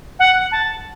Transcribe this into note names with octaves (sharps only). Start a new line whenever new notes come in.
F#5
A5